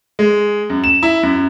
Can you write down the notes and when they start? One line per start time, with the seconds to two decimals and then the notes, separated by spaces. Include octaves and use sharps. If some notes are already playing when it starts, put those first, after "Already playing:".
0.19 G#3
0.70 F#2
0.84 E7
1.03 E4
1.23 F#2